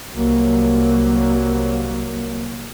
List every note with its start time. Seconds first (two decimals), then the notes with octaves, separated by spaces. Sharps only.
0.12 C2 F#3 A#3